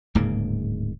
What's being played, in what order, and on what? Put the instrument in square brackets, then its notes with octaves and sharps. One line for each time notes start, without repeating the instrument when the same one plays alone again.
[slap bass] D1 G#2 C#3 A#3